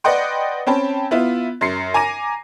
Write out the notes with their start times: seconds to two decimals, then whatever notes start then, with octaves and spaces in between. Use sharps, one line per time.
0.04 B4 D5 D#5 F#5 G5 C6
0.67 C4 C#4 G5 A5 B5
1.11 B3 E4 F4
1.61 F#2 C6 C7 C#7
1.94 G#5 A#5 D6 A#6 D#7